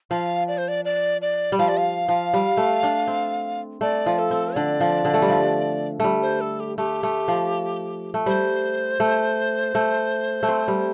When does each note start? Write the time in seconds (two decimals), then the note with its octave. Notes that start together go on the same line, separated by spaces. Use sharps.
0.11 F3 F5
0.48 D5
0.58 C5
0.68 D5
0.85 D5
1.22 D5
1.52 G3
1.59 F3 F5
1.68 D5
1.77 F5
2.08 F3
2.34 G3
2.57 A3
2.83 D4
3.07 C4
3.81 A3 D5
4.06 F3
4.19 A4
4.31 C4
4.55 D3 D5
4.80 F3
5.05 D3
5.14 A3
5.22 G3
5.30 F3
6.00 G3 A3
6.22 C5
6.41 A4
6.60 G4
6.78 A3 G4
7.03 A3
7.28 F3
8.14 A3
8.26 G3 C5
9.00 A3
9.75 A3
10.43 A3
10.48 C4
10.68 G3